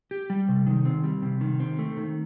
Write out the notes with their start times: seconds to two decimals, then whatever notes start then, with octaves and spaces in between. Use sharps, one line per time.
0.11 G4
0.30 G3
0.48 C3
0.66 D#3
0.85 C4
1.04 G3
1.22 C3
1.41 D#3
1.60 C4
1.79 A3
1.97 D#3